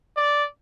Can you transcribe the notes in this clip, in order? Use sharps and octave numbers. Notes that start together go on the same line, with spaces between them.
D5